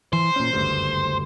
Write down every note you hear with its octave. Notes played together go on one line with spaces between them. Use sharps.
E3 C5
A#2 C#4
F#1 D2 G2